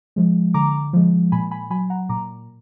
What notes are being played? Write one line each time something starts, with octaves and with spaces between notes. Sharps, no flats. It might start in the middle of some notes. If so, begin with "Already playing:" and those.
F3 G#3
D3 A#5 D6
F3 G#3
A#2 G#5 B5
G#5 B5
F#3 G#5 B5
F#5 A#5
A#2 A#5 D6